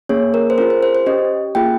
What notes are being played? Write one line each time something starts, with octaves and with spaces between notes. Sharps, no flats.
A#3 C#4 G#4 C#5
A#4
C5
C#4 F4 G#4 A#4
C5
C5
C5
C#4 G4 D#5
A#3 F4 G#4 G5